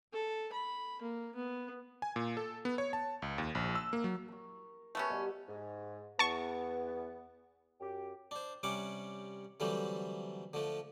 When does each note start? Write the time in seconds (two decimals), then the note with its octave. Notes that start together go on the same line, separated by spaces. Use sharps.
0.13 A4
0.52 B5
1.02 A#3
1.35 B3
2.02 G#5
2.16 A#2
2.37 A4
2.65 B3
2.78 C#5
2.93 A5
3.22 C#2
3.38 D#2
3.55 A#1
3.75 E6
3.93 A#3
4.04 F#3
4.28 A#4 C#6
4.95 A3 B3 C#4 G4 A#4 E5
5.10 B2 G3
5.49 G#2
6.19 E2 B3 A5 C#6
7.81 F#2 G4
8.31 D4 C5
8.63 C3 G3 C#4 F#5 D6
9.60 D3 E3 F#3 G3 A3 C4
10.53 D3 F3 A3